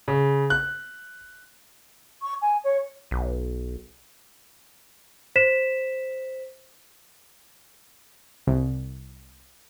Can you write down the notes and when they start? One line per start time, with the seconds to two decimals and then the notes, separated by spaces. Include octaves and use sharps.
0.08 C#3
0.50 F#6
2.22 C#6
2.42 G#5
2.64 C#5
3.11 B1
5.36 C5 B6 E7
8.47 C2